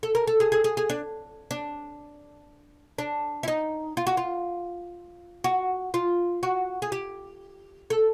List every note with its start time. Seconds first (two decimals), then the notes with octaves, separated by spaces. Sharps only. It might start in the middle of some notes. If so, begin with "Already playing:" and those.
0.03 A4
0.15 A#4
0.27 A4
0.40 G#4
0.52 G#4
0.64 G#4
0.77 G#4
0.90 D4
1.51 D4
2.98 D4
3.43 E4
3.48 D#4
3.97 F4
4.07 F#4
4.17 F4
5.44 F#4
5.94 F4
6.43 F#4
6.82 G#4
6.92 G4
7.90 A4